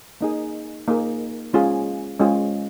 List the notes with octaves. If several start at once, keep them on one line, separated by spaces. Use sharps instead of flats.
A#3 D#4 G#4
A#3 D#4 G#4
G#3 C#4 F4 G#4
G#3 C#4 F4 G#4